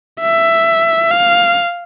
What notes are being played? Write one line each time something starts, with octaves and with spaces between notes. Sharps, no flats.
E5
F5